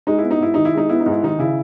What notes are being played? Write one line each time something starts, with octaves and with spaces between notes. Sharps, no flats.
G#3 D#4
B3 E4
D#4
G#2 E4
D#3 D#4
E4
G#3 D#4
B3 E4
D#4
G#2
E4
D#3 D#4
C#3 E4